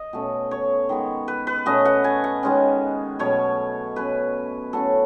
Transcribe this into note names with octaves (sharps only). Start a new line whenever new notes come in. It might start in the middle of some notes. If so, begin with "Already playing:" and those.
Already playing: D#5
B2 A3 C#4
C#5
D#3 G#3 B3
B4
B4
B2 A3 C#4 D#5
F#5
G#5
F#5
D#3 G#3 C#4
B2 F#3 A3 C#5
B2 A3 C#4 B4
A2 F#3 A3 C#4 A4